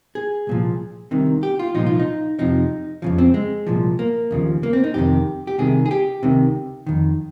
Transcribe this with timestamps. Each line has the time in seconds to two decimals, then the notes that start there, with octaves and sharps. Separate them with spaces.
0.15 G#4
0.47 C2 A#2 F3
1.11 C2 C3 D#3
1.43 G4
1.59 F4
1.74 C2 A#2 F3 D#4
1.87 F4
2.00 D#4
2.39 F2 C3 F3 D#4
3.02 F2 C#3 F3
3.18 C4
3.34 G#3
3.67 C2 A#2 F3
3.99 A#3
4.31 D#2 C#3 F3
4.63 A#3
4.73 C4
4.84 D#4
4.94 F2 C3 D#3 G4
5.47 G4
5.58 C2 C3 D#3 G#4
5.86 G#4
5.91 G4
6.23 C#2 C3 D#3
6.86 F2 D#3